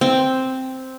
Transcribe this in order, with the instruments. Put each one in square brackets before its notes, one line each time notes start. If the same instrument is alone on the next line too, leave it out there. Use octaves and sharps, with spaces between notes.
[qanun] C4